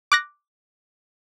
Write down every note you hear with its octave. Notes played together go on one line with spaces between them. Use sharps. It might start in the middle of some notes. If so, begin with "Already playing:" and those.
D6 F#6 A#6